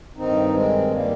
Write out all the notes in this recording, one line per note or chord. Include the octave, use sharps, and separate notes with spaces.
G2 D#3 C4 D#4
G#3 C4
G3 A#3